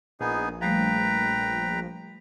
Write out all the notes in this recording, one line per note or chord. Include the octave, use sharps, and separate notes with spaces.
A#1 B3 D#4 G#4
F3 G3 A3 B4 G5 A#5